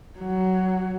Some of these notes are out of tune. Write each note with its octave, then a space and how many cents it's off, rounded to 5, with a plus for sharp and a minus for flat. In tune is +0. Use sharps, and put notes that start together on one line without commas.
F#3 +15